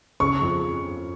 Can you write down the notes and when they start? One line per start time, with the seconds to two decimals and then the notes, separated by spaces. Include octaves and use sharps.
0.20 C#3 C#6
0.42 F2